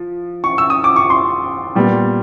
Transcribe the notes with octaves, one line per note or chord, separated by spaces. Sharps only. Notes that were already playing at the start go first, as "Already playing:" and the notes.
Already playing: F3
C#6
E6
D#6
D6
C#6
C6
A#2 G3 B3